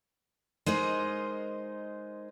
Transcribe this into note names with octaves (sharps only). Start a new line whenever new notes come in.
G#3 D#4 A#4 C5